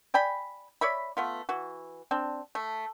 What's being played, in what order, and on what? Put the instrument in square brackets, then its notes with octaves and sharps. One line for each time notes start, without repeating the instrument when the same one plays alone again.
[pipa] D5 G5 G#5 B5
C#5 D5 E5 B5
A3 B3 F4
E3 F#4
C4 D4
A3